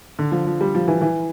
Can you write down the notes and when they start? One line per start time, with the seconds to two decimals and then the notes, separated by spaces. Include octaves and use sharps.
0.19 D3
0.32 F3
0.47 F3
0.61 G3
0.75 F3
0.88 E3
1.01 E3